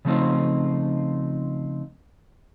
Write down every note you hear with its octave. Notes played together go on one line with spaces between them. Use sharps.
C#3 F3 A3 C4 D#4 F4